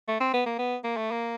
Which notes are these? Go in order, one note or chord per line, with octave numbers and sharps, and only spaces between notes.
A3
C4
B3
A#3
B3
A#3
A3
A#3